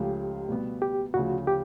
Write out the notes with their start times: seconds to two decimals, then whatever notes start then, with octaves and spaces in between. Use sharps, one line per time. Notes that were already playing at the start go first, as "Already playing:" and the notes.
Already playing: C#2 C#3 F3 A3 G4
0.48 B2 G3 B3
0.82 G4
1.14 D2 C#3 F3 F#4
1.47 G4